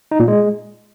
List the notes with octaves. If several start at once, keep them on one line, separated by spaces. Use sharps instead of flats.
D#4
A#2
G#3